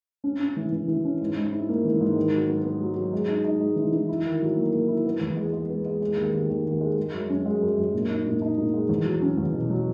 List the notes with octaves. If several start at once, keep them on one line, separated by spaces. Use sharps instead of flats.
C#4
C#4
E3
E3
E3
C#4
G#2
G#2
E4
A#3
E3
G#2
D#3
F#3
B3
B3
F#3
F#3
G#3
D#4
D#4
G#3
E3
E3
E4
D#3
F#3
A#3
A#3
E4
B3
E2
G#3
G#3
B3
G#3
G#3
D#2
D#2
D#2
D#2
G#3
G#3
F#2
C#4
G#3
F#2
F#2
A#2
D#4
A#2
D#4
A#2
G#3
E2
F#3
C#4
E2
B2
F#3